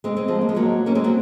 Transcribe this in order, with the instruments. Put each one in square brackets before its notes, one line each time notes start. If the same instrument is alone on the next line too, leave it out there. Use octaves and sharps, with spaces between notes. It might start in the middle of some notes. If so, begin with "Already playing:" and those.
[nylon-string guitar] G#3 C4
G#3 C4
F3 G#3
A#3
G#3
F#3 A#3
A#3 C#4
G#3 C4
F#3 A#3